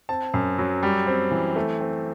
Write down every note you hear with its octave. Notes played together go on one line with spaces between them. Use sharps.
C4 A5
F#2
F#3
G3
C4
E3
A3
C4